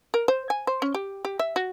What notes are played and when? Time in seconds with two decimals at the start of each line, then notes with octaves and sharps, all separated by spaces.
0.14 A#4
0.28 C5
0.50 G#5
0.67 C5
0.82 C#4
0.94 G4
1.25 G4
1.39 E5
1.56 F#4